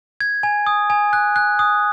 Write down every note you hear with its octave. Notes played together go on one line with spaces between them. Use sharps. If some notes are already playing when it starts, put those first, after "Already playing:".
G#6
G#5
D#6
G#5
F#6
F#6
D#6